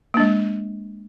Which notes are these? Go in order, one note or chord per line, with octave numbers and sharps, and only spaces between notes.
G#3 A#3 D4